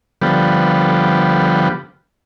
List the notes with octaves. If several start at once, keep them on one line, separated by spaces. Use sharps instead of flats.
D3 F3 G3 B3